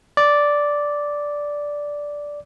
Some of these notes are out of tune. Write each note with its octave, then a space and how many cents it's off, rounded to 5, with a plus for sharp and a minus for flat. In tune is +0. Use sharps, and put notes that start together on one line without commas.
D5 -5